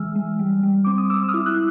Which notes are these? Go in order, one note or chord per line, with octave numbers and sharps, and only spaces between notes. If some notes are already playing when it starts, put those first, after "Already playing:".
Already playing: E3 G#3 E6 F6
G#3
G3
G3
C4 D6
D#6
C4 D6 E6
E6
D#6 F6
E4
E6 F#6